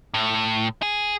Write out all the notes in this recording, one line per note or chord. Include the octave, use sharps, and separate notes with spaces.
A2
G#4